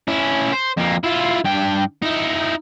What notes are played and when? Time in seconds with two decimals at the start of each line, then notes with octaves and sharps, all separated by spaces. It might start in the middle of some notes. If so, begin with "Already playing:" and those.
0.08 C#4 E4
0.53 C5
0.77 F2 A#3
1.04 E4 F4
1.45 G2 G5
2.02 D#4 E4